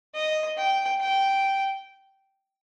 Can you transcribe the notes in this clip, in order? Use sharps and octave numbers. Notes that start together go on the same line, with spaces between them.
D#5
G5
G5